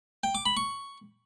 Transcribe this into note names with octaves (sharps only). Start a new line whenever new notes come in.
G5
D6
B5
C#6